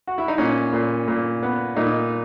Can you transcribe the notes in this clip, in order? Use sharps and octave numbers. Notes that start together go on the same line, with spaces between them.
F#4
E4
D#4
A#2 C#4
A#2
A#2
B3
A#2 D#4